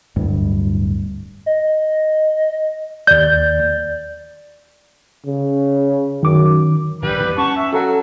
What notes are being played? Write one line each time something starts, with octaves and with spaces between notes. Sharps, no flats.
D1 G2
D#5
D#2 D5 G6
C#3
F#2 D#3 D6
A#1 G#2 D3 G3 B4
E2 G2 D#3
C#4 F#5 A5 C#6
E5
F#3 A4 A#4 F#5